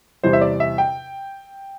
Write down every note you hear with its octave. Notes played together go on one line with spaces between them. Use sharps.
E2 C3 E3 G3 C5
E5
D5
E5
G5